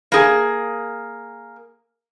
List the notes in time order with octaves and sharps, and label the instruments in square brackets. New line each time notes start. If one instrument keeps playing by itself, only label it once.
[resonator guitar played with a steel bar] A#3 G#4